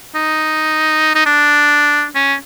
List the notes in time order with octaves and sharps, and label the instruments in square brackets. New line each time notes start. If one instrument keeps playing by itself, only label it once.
[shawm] D#4
D#4
D4
C#4